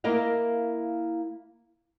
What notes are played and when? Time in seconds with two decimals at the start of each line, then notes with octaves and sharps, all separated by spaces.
0.04 A#3 E4 A#4 D#5 F5